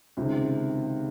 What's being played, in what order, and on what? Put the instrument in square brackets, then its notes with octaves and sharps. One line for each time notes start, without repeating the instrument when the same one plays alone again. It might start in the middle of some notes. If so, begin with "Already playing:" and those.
[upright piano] C#2 C3 D#3